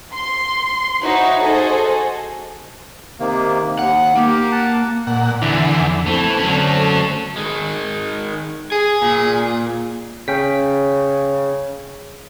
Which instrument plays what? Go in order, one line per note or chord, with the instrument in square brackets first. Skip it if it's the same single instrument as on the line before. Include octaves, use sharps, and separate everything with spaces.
[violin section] C6
D#4 E4 F#4 C5 C#5
F#4 G#4 A4 C5 D#5
[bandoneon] C3 D#3 A#3
[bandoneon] D#2 [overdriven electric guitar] F#5
[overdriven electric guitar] A#3 [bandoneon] G4
[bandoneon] F#5 A5
[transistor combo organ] A#2 F#5
[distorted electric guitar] E2 [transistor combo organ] D3 E3
[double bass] F2
[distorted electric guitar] E3 [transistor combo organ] A3 [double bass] C4
[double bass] D3 C4 [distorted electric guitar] F#3 C#4
[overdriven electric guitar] D#3 G#3
[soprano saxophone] G#4 [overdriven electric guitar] G#5
[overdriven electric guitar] A#2
[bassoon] C#3 [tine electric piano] C#4 G5 B6